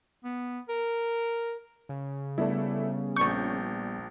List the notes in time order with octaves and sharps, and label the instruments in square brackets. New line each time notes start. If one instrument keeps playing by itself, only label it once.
[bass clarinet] B3
A#4
[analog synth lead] C#3
[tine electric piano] G3 B3 [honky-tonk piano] A3 D4 E4
[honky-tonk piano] A#1 D4 G6 [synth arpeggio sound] C#6